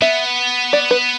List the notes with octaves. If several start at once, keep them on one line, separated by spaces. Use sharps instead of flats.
B3 E5
D5
B4